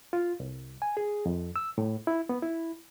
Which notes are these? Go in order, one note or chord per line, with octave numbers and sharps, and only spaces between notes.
F4
C2
G#5
G#4
F2
E6
A2
E4
B3
E4